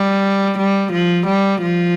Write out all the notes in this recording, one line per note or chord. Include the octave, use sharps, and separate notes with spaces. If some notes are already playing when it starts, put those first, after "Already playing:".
Already playing: G3
G3
F3
G3
F3